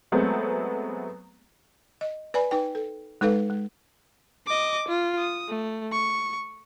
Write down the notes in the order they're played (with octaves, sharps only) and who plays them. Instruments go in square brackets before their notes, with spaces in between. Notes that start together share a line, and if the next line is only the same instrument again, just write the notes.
[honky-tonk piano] F#3 G#3 A3 B3 C4
[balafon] D#5
B4 D5 G#5 B5
D#4 B4 G5
A4
G#3 D#4 A4 B4 F5
G#3
[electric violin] D#5 D6
F4
D#6
A3
C#6